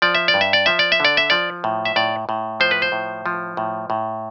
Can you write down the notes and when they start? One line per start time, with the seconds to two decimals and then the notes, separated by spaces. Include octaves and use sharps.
0.02 F3 D5
0.15 E5
0.28 D5
0.34 G2
0.41 E5
0.53 D5
0.66 F3 E5
0.79 D5
0.92 E5
1.00 D3 D5
1.17 E5
1.30 F3 D5
1.64 A2
1.85 E5
1.96 A2 D5
2.29 A2
2.60 F3 C5
2.71 B4
2.82 C5
2.92 A2
3.26 F3
3.57 A2
3.90 A2